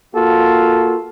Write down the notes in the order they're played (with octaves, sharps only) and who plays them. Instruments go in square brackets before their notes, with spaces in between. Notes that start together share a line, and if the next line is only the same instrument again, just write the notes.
[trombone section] A#3 F4 F#4 A4